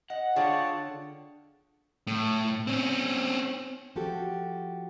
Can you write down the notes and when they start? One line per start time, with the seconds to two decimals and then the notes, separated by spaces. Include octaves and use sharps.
0.10 D#5 F#5
0.36 D3 F4 G#4 C#5 D5 G5 A5
2.07 A2
2.67 C4 C#4
3.96 F3 F#4 G4 A4